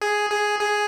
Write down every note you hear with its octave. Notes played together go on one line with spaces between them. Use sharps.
G#4
G#4
G#4